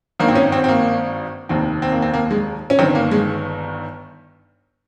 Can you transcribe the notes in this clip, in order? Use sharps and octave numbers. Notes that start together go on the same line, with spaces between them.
G#1 G2 D#3 A#3
C4
C#4
C4
C4
A#3
F1 D#2 D#3 C4
C4
A#3
C4
A#3
G#3
C#4
G1 G2 D#3 C4
A#3
G#3